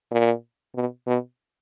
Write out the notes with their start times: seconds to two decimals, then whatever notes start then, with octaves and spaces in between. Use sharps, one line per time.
0.12 A#2
0.76 B2
1.07 B2